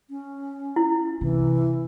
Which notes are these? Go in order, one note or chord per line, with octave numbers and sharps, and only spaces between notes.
C#4
E4
C3 E3